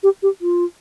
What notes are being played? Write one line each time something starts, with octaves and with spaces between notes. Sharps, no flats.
G4
G4
F4